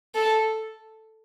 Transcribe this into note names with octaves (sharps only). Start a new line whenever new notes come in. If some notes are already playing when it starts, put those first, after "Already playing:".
A4